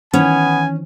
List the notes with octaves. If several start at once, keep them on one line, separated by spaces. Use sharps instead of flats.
D#3 E3 B3 C#4 G#5